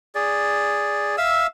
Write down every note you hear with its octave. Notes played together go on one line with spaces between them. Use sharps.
G#4 D5
E5 F5 E6